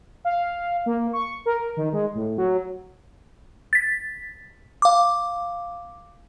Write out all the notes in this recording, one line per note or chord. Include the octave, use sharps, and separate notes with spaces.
F5
A#3
C#6
A#4
D#3
G#3
A2
F#3
A6 B6
F5 D6